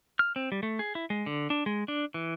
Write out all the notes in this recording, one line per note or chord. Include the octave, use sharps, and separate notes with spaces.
F6
C4
G3
A3
G#4
E4
G#3
D3
D4
G#3
D4
E3